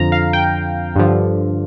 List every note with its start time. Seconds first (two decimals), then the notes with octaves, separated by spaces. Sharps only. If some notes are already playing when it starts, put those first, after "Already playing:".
Already playing: F2 D3 F3 A#5
0.12 F5
0.33 G5
0.95 G2 D3 F3